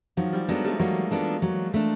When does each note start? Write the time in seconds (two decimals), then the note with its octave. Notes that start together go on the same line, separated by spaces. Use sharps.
0.17 D#3 F3 F#3
0.33 F3 G3
0.48 F#3 G#3 B3 D4 F4 A4
0.64 G3 A3
0.79 F#3 G#3 A#3
1.11 B3 D4 F4 A4
1.42 F#3
1.74 A3 D4